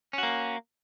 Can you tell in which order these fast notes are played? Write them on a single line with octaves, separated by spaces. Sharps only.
C#4 F#4 A#3